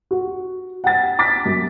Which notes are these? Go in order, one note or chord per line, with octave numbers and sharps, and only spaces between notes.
F#4
F#5 G5 A6
D6 A6 B6
F#2